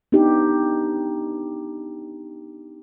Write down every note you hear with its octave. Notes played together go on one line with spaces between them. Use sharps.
B3 D4 D#4 G4